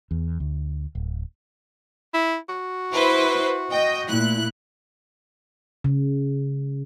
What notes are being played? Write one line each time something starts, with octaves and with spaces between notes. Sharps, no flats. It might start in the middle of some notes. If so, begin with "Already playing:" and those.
E2
D2
D1
E4
F#4
E4 B4 C5
D#5 G5
A#2 A3 E4 F#6
C#3